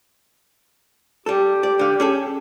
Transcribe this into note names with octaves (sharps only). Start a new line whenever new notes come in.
G3 G4 A4
D5
D3 F5
C#4 G#4 A4